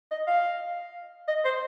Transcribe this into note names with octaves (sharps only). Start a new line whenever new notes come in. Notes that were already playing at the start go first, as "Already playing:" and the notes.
D#5
F5
D#5
C5